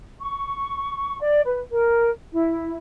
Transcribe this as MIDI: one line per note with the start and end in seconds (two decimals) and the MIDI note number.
0.20 1.19 85
1.21 1.40 74
1.43 1.60 71
1.70 2.09 70
2.31 2.76 64